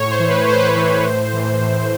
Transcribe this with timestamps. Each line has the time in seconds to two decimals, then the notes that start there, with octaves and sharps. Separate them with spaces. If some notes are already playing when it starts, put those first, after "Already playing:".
Already playing: A2 C#5
0.10 C5
0.20 E3
0.29 B4
0.48 A2 C5
0.59 B4
0.71 C5
0.76 E3
1.05 A2
1.33 E3
1.61 A2